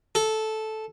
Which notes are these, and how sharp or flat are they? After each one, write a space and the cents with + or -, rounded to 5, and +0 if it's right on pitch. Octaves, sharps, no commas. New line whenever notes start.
A4 -10